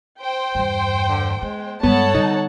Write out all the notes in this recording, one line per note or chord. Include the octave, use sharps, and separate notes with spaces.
C5 G5
E2 G2
D3
G#3 B3
G2 G#3 B3 A4 C#5 F#5 A5
D3 G3 D#4